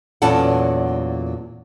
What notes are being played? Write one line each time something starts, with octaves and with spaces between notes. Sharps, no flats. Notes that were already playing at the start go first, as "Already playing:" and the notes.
E2 A#2 F#3 C#4 A4 F#5